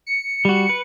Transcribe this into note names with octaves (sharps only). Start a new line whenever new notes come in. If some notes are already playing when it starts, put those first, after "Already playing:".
C#7
G3 F#4
B4